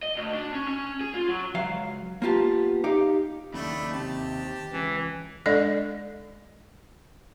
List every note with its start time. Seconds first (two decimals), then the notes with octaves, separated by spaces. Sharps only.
0.03 D#5
0.16 D2
0.34 D4
0.54 C#4
0.68 C#4
1.01 G#4
1.14 F4
1.28 F#3
1.54 C#2 F#3 F5
2.22 A#3 B3 F4 G4 A5
2.84 D#4 G4 F5
3.54 F#1 D#2 D#3 A3 D4 B5
3.93 C3 G4 A5
4.72 C#2 E3
5.46 G#3 D4 A4 D5 D#5